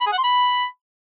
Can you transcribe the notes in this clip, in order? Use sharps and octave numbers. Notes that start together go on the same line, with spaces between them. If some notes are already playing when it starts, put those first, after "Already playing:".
B5
G#4
F#5
C6
B5